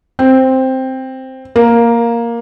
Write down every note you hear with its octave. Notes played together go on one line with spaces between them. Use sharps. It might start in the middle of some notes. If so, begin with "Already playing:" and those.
C4
A#3